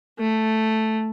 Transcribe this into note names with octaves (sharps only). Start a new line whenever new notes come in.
A3